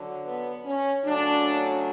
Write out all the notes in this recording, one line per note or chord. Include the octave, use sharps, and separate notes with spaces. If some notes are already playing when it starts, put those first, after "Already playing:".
Already playing: D3 F#3
B3
C#4
C#3 F#3 A3 D4